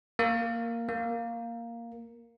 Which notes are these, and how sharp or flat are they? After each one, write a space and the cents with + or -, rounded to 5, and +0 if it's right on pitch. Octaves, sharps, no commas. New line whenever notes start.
A#3 -5
A#3 +0